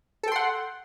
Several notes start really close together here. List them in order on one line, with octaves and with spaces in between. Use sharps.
A4 G5 C6 F#5